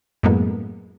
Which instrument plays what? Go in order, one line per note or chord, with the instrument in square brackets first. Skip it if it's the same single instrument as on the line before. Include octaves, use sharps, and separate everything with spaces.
[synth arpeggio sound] F#2 A2 G#3 A#3 B3